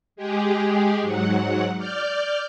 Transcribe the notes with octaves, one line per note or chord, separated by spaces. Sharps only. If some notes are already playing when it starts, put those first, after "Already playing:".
G#3 G4 G#4
G#2 F#3 F#5
D5 F6 G6